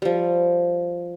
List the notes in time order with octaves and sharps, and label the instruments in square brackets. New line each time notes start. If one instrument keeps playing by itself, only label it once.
[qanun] F3 G3